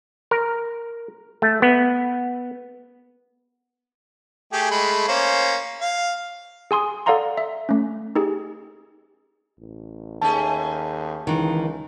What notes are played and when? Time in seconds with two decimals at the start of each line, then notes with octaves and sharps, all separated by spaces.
0.31 A#4
1.42 A3
1.62 B3
4.52 A3 G4 G#4
4.71 G#3 A3 B5
5.08 A#3 C#4 C5
5.81 F5
6.71 G#4 G#5 C6 D#6
7.06 A4 D5 F5 F#5 A#5 C6
7.37 E5
7.69 A3 C#4
8.15 D#4 G4 G#4
9.59 A1
10.22 D#2 A3 C#4 G#4 A5
11.27 C#2 D#3 E3